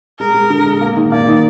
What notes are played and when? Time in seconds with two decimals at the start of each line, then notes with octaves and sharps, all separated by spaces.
0.19 G#3 A#4
0.34 G#3
0.50 D3
0.66 G#3
0.81 A#3
0.96 D#3
1.12 A#3 D5
1.28 D#3